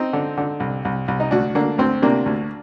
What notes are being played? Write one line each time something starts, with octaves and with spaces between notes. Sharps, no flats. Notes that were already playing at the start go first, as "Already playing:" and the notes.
Already playing: C4 D#4
D3
D3
C2
C2
C2
D#4
D2 D4 F#4
D3 A#3 D4
D2 C4
C3 A#3 D4
D2